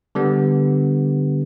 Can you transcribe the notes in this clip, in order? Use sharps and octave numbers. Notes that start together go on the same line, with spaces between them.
D3 G3 B3